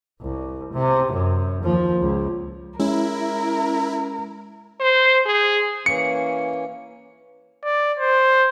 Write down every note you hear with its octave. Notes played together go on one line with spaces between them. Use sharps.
C2
C3
F#2
D#2 F3
C#2
G#3 C#4 E4 A#4
C5
G#4
E3 A#3 C#4 C#7
D5
C5